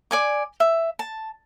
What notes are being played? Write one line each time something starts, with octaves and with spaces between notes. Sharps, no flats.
D5 G#5 D6
E5
A5